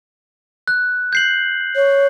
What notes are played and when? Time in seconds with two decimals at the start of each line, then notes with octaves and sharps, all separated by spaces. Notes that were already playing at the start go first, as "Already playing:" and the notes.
0.68 F#6
1.13 G6 C7 F#7
1.76 C#5